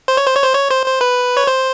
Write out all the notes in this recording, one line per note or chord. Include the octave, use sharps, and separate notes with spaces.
C5
C#5
C5
C#5
C5
C#5
C5
C5
B4
C#5
C5